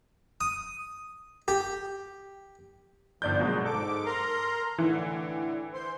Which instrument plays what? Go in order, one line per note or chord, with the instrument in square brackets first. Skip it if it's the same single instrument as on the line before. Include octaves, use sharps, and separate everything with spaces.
[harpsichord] D#6
G4
[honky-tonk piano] G1 D5 G6 [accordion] A#2 F3
[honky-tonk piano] B2 F#3 G#3
[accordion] G#2 D6 [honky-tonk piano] A4
[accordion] A#4 A#5 C6
[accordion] A2 D3 [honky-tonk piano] E3
[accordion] C5 C6